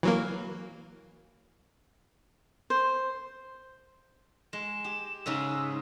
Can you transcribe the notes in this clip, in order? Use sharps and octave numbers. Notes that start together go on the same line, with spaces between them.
E3 F#3 A#3
C5
G#3 E7
G4
G#2 C#3 G#3 E6